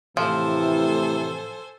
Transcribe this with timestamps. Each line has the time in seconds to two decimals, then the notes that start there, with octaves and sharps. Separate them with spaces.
0.17 A2 C3 E3 F3 A4 C5 G#5